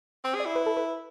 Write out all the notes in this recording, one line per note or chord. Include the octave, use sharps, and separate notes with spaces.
C4 C5
G#4
D5
E4
B4
A4
B4